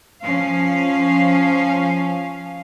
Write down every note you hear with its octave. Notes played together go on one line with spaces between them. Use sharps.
F3 C#4 F5